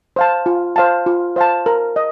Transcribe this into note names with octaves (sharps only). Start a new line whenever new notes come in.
C5 F5 A5
F4
C5 F5 A5
F4
C5 F5 A5
A#4
D#5